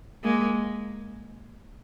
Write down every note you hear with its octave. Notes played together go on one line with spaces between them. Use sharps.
G#3 A#3